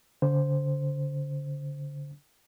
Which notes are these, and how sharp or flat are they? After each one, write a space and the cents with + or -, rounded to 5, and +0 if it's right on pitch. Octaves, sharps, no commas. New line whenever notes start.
D3 -35 C5 +0